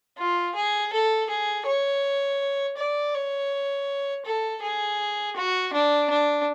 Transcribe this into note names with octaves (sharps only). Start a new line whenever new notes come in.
F4
G#4
A4
G#4
C#5
D5
C#5
A4
G#4
F#4
D4
D4